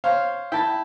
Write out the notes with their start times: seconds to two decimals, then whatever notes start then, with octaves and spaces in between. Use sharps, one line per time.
0.04 C5 C#5 F5
0.52 E4 G5 A5 B5